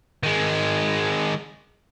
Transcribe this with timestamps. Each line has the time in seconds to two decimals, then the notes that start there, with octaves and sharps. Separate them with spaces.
0.23 D#3 G#3